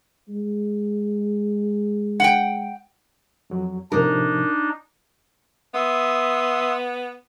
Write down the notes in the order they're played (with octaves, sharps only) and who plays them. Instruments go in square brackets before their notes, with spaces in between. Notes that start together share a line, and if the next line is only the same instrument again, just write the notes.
[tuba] G#3
[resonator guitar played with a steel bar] F#5 G5
[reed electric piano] F2 F#3
[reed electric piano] A2 C3 F3 [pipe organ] D4 D#4 [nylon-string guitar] A#4
[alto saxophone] B3 [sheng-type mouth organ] E5 C6 D#6